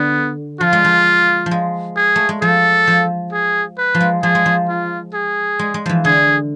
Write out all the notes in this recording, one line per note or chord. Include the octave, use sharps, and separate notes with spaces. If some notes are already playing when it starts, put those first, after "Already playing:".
Already playing: D3 B3
F3 F4
G#3
F3
F3
G#3
G#4
A3
G#3
F3 A4
F3
G#4
B4
F3
G#3
F3 G#4
G#3
F3
F4
G#4
G#3
G#3
E3 F3
D3 G#4